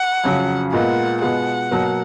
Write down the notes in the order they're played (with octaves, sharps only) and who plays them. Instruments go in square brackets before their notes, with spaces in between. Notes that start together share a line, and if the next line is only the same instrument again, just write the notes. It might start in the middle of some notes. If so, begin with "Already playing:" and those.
Already playing: [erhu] F#5
[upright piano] F2 C#3 F#3
[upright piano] A#2 G#3 B3 F4 A#4 [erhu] F#5
[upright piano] B2 G#3 B3 F4 G#4 [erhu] F#5
[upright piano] B2 F#3 A#3